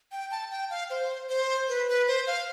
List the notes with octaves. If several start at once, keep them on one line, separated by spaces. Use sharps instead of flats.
G5
A5
G5
F5
C5
C5
B4
B4
C5
F5